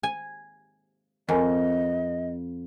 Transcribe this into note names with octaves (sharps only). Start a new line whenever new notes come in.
G#5
F2 C4 A#4 D#5 G#5